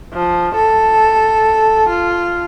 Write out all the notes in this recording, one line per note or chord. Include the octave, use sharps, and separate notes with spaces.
F3
A4
F4